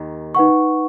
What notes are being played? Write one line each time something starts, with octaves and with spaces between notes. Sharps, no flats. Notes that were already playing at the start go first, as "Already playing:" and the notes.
Already playing: D#2 D#3
D#4 B4 F#5 C#6